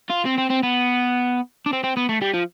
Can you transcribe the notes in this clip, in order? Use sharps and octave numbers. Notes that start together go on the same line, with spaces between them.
F4
C4
C4
C4
B3
D4
C4
C4
B3
A3
G3
F3